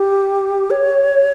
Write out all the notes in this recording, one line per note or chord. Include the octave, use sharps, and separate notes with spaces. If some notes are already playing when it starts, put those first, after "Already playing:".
Already playing: G4
C#5